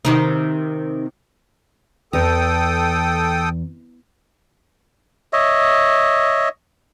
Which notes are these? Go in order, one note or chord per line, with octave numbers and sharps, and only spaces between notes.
C3 D#3 D#4
E2 A4 G5 D#6
C#5 D#5 E5